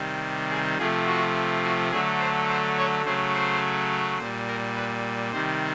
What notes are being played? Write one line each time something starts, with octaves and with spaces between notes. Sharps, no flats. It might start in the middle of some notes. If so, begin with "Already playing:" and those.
Already playing: C3 D#3 G3
G#4
C3 F3 A3 G#4
F#4
F#4
D3 F#3 A3 G#4
C5
C5
C#5
C#3 F#3 A3 C5
C5
A#2 G3 C5
A#4
B4
C3 D#3 G3 C5